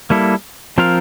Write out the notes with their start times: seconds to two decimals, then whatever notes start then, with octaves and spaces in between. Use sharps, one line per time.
0.10 G3 A#3 E4 A4
0.78 F3 C4 F4 A#4 F5